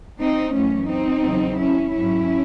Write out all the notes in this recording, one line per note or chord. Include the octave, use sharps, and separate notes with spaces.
C4 D#4
F#2 E3 A3 C#4
C4 D#4
E2 C#3 F#3
C#4 E4
G#2 F#3 C#4 E4